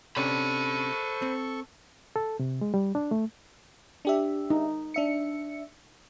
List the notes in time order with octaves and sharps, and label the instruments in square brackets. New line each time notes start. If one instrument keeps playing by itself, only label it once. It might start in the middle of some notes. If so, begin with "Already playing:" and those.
[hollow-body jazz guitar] C3 C#4 D4 [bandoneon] A4 C#6 [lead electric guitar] C5 B5
[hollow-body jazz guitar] C4
[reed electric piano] A4
C3
G#3
G3
D4
A3
[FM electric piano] D4 G4 E5
[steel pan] D#4
[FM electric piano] D4 E5 C#7